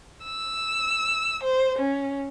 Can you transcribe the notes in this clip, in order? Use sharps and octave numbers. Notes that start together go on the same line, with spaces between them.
E6
C5
C#4